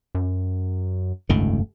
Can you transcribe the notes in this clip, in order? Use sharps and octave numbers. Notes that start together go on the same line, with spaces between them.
F#2
F1 C#2 G2 D#3 A3